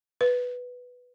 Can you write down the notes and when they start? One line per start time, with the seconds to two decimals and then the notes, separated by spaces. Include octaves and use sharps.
0.21 B4